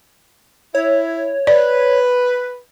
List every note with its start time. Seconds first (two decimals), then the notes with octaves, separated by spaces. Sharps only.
0.75 E4 C#5
1.47 B4 D5